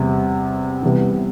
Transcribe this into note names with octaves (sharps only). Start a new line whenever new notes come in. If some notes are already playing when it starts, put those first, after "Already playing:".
Already playing: E2 C3 G3
C3 E3 G3 B3